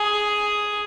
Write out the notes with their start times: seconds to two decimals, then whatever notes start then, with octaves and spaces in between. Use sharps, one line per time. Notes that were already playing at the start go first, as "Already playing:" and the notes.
Already playing: G#4